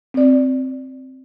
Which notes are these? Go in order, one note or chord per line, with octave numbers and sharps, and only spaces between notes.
C4 D5